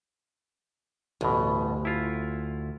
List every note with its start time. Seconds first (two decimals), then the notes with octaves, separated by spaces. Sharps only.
1.21 A1 D2 G2 B2
1.85 E4 F4